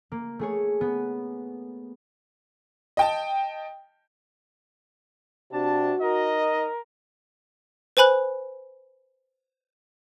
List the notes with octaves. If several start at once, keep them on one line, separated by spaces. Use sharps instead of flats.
A#3
A3 G#4 C#5
B3
D#5 G5 A5
C3 D4 F#4 A5
D#4 A#4 D#5
B4 C5 G#5 B5 F#6